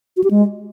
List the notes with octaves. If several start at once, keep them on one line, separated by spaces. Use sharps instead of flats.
F#4
G4
G#3